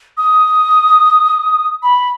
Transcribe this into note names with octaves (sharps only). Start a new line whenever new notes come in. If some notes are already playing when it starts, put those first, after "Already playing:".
D#6
B5